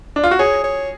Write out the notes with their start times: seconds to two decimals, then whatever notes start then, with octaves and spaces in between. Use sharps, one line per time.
0.16 D4
0.24 F4
0.31 F#4
0.39 G#4 C#5
0.64 C#5